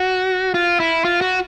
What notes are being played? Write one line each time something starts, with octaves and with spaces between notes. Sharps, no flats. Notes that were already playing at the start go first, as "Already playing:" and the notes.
Already playing: F#4
F4
E4
F4
F#4